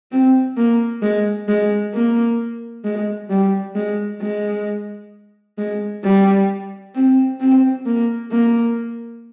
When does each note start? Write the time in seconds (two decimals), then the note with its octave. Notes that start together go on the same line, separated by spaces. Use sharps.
0.12 C4
0.57 A#3
1.03 G#3
1.48 G#3
1.94 A#3
2.85 G#3
3.30 G3
3.75 G#3
4.21 G#3
5.58 G#3
6.04 G3
6.95 C4
7.40 C4
7.86 A#3
8.31 A#3